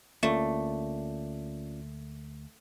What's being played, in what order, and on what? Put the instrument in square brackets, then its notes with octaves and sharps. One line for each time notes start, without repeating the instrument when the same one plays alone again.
[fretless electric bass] D2 A#3 [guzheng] A3 [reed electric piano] C#4 F4 D5